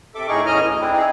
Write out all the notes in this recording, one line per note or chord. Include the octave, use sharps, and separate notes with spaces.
C3 A4 E5 D6
A2 D#4 G#4 A#4 C#6
E2 A2 C#4 D#5 A#5 F6
D2
C4 D4 E4
C4 D#4 G#4